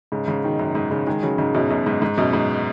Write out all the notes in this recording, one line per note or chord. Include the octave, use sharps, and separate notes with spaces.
G#2 C#3
G#2 C#3
B2 D#3
F#2
G#2
G#2 C#3
D#3 G#3
C#3 F#3
G#2 C#3
F#2 B2
F#2 B2
G#2
G#2
F#2 B2
G#2